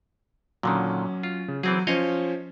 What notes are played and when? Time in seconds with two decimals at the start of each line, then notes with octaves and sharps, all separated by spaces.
0.63 A#2 D3 D#3 F#3 C#4
1.23 F4
1.48 C#3
1.63 E3 F#3 C4 G#4
1.87 F3 C#4 C5 C#5 D#5 F5